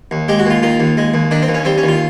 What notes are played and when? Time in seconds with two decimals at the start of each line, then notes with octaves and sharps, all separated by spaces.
0.11 D#2
0.28 G#3 G4
0.39 F#4
0.46 D#2 F4
0.63 D#3 F4
0.80 D#2
0.97 G#3
1.14 D#2
1.31 D#3 D4
1.42 C4
1.48 D#2
1.54 C#4
1.65 G3 C4
1.78 C#4
1.83 D#2
1.88 F4